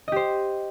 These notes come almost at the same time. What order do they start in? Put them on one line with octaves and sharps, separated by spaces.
D#5 G4 C5